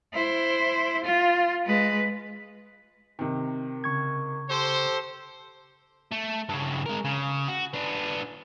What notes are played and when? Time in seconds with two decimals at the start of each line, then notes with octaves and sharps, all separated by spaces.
0.14 E4 C5
1.05 F4
1.66 G#3 B4
3.19 C3 D#3
3.84 C#3 C#6 G#6
4.50 G4 A4 C5
6.11 A3
6.49 G2 C#3
6.86 G#3 A#4
7.04 C#3
7.48 F#4
7.73 B3 D4